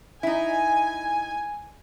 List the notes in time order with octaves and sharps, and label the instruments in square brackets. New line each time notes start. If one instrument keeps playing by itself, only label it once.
[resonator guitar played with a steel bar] D#4 E4 [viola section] G#5